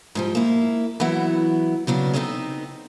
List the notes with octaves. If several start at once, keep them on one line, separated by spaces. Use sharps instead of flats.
G#2 F3 G3
A#3 E4
E3 F#3 B3 E4 F#5
C#3 F#3 B3 D4
B3 C4 D#4 A4 C#5 D#5